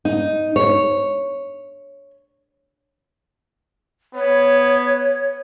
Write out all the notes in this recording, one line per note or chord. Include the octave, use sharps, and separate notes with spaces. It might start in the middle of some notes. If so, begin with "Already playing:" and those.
D#4
C#5
B3 C#5